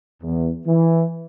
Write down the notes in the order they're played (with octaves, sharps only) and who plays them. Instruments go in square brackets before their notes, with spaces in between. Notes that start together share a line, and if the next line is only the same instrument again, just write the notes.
[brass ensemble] E2
E3